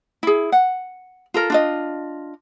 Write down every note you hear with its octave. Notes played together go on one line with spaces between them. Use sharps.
E4 G#4
F#5
F4 A4 A#4
D4 F4 D#5